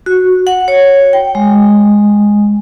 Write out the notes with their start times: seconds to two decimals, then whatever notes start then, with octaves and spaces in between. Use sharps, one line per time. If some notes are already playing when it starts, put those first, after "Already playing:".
0.06 F#4
0.47 F#5
0.68 C#5
1.13 G5
1.35 G#3